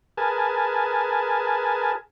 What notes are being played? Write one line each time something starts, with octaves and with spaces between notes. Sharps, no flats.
G#4 A#4 B4 G#5 A5